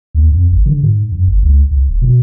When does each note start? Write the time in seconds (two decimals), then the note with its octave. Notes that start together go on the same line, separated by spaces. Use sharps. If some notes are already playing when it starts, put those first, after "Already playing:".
0.15 D#2
0.32 F2
0.51 G#1
0.66 D3
0.83 G#2
1.12 F#2
1.27 G1
1.43 C#2
1.71 C2
1.89 D#1
2.02 B2